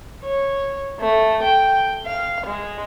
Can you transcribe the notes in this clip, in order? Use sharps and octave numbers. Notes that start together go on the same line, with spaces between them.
C#5
A3
G5
F5
G#3